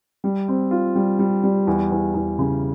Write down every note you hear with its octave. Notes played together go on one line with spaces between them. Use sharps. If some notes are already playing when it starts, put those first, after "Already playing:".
G3
C4
F4
G3
G3
G3
E2
E2
E2
C#3